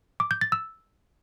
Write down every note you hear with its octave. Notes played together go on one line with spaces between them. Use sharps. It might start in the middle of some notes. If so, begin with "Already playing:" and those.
D6
G6
A6
E6